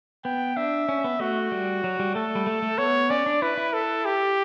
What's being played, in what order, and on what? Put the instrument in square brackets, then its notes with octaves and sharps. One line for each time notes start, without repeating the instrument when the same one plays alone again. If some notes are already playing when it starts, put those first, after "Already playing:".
[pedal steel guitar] B3 [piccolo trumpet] G5
[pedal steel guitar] D4 [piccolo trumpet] E5
[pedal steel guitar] C#4
B3
[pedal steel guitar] A3 [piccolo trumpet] F#4
[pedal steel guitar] G3
F#3
G3
[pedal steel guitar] A3 [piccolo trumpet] A4
[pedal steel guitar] G3
A3
A3
[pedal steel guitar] B3 [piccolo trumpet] C#5
[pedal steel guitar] C#4 [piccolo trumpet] D5
[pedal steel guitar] D4
[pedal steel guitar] E4 [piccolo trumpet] B4
[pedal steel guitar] E4
[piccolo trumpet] A4
G4